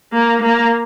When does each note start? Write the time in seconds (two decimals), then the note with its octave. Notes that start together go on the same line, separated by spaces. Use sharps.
0.13 A#3
0.42 A#3